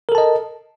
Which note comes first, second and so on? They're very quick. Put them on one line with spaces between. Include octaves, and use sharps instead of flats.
A#4 A4 A5 D#5